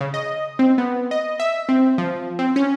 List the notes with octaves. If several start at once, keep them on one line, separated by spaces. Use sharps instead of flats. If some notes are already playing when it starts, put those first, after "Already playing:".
C#3
D#5
C4
B3
D#5
E5
C4
F3
C4
C#4